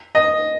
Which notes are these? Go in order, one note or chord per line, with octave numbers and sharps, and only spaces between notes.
D#5